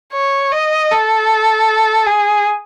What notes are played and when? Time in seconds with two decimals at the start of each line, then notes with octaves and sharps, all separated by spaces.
0.13 C#5
0.52 D#5
0.92 A4
2.06 G#4